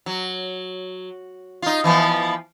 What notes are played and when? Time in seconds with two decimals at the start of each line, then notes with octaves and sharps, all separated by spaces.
0.06 F#3
1.62 D#4 F4
1.84 E3 F3 B3